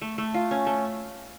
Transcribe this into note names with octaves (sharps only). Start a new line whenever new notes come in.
A3
A3
F4
C#4
A3